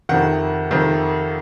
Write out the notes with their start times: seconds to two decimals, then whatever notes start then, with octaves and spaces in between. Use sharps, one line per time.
0.09 F2 C3 D#3 F#5
0.71 F2 C3 D#3